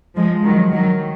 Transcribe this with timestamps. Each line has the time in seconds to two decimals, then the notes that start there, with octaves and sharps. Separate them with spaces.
0.16 F3 G#3
0.44 D#3 F#3
0.72 D#3 F#3